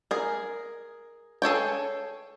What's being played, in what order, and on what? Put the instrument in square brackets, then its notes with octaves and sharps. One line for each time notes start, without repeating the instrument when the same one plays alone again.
[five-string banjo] G#4 A#4
G#4 A4 C#5 G5